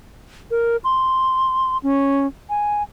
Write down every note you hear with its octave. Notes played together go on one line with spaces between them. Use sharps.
A#4
C6
C#4
G#5